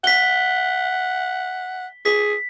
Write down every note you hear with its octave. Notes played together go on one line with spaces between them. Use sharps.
F#5 B6 G7
G#4 B6